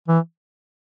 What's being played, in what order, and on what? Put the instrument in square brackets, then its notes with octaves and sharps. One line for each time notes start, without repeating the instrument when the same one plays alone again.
[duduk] E3